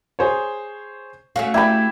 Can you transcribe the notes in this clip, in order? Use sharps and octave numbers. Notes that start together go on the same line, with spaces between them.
G#4 C5 C#5
A3 C#4 F#4 F5
E4 G4 B5